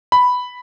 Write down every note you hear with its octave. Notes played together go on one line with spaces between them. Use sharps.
B5